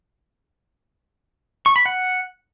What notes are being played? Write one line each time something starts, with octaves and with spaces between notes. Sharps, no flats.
C#6
B5
F#5